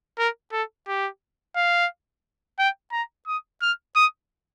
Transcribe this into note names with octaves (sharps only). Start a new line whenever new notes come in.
A#4
A4
G4
F5
G5
A#5
D#6
F6
D#6